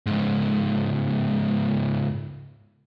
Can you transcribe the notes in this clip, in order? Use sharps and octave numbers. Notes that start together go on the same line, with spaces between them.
C#2 G#2